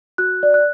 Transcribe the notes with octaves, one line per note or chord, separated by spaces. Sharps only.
F#4 F#6
D5
F#6